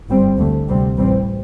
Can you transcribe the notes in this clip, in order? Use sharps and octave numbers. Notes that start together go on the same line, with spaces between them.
G1 G2 G3 C4
D2 D3 A3
D2 C3 G3 C4
A1 A2 E3 G3 C4